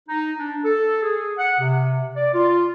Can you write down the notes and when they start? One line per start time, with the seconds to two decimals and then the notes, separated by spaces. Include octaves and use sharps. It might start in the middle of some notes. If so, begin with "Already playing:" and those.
0.08 D#4
0.40 D4
0.65 A4
1.03 G#4
1.39 F#5
1.60 C3
2.16 D5
2.34 F4